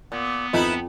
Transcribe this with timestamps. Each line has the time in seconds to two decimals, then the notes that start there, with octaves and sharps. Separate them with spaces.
0.12 A#2 B3
0.53 F2 D#4 E4 B4